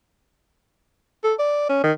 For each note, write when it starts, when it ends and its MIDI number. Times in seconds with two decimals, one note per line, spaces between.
1.24 1.34 69
1.39 1.65 74
1.69 1.79 61
1.83 1.92 51